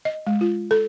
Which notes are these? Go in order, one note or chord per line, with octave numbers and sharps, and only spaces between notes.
D#5
G#3
F4
A4